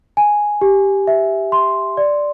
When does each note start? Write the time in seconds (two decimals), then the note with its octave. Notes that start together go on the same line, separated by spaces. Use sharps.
0.17 G#5
0.61 G4
1.07 E5
1.52 C6
1.97 D5